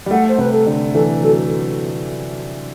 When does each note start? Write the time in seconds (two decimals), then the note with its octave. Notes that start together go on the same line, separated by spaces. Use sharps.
0.06 G3
0.11 A3 F#5
0.28 C5
0.38 C3 B4
0.52 A4
0.67 D3
0.94 E3 A4
1.22 F#3 A4